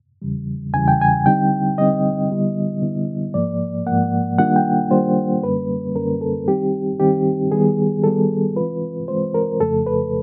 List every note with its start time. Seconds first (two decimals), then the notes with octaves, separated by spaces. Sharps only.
0.22 E2 C#3 E3 G3
0.73 E2 C#3 E3 G3 G#5
0.88 G5
1.01 G#5
1.26 D3 G3 C4 D#4 G5
1.78 D3 G3 C4 D#4 D#5
2.31 D3 G3 B3 E4
2.82 D3 G3 B3 E4
3.34 G#2 F3 A#3 D5
3.86 G#2 F3 A#3 F#5
4.39 D#3 G3 A#3 D4 F4 F#5
4.56 G5
4.91 D#3 G3 A#3 D4 F4 C5
5.43 F#2 D3 G3 A#3 C#4 B4
5.95 F#2 D3 G3 A#3 C#4 A#4
6.21 A4
6.48 D#3 G3 C4 D#4 G4
7.00 D#3 G3 C4 D#4 G4
7.52 D#3 G3 B3 G#4
8.04 D#3 G3 B3 A4
8.56 E3 G#3 C4 F4 B4
9.08 E3 G#3 C4 F4 C5
9.34 A#4
9.60 F2 C#3 F3 A3 A4
9.87 B4